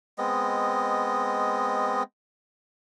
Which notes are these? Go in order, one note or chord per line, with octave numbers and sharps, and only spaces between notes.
G#3 B3 C4 D#5